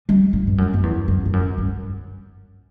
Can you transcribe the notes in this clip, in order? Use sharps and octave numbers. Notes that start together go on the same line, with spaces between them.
G3
A2
G2
F#2
F#2
E2
F#2
G2
F#2
G2